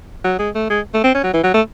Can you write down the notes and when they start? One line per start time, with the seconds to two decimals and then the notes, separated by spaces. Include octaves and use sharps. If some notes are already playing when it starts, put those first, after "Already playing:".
0.24 F#3
0.39 G#3
0.55 A3
0.70 G#3
0.94 A3
1.04 C4
1.14 C#4
1.23 F#3
1.34 E3
1.43 F#3
1.54 A3